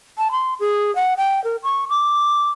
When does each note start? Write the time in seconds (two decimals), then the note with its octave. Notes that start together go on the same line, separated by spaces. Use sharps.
0.18 A5
0.32 C6
0.60 G#4
0.96 F#5
1.17 G5
1.44 A#4
1.63 C#6
1.90 D6